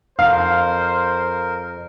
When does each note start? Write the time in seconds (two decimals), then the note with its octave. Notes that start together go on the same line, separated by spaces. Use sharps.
0.19 F2 A#4 C5 F5